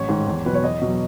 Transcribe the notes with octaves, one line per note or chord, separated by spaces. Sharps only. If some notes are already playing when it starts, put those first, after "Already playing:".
Already playing: A1 C#5
G#2 D#3
E2
B2 F#3 B4
C#5
E2 D#5
B2 F#3